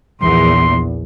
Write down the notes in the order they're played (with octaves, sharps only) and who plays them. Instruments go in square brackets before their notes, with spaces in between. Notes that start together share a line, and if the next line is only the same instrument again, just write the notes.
[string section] A#1 E2 [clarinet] C6